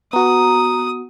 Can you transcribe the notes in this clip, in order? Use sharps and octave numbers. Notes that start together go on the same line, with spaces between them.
B3 F#4 A#5 D#6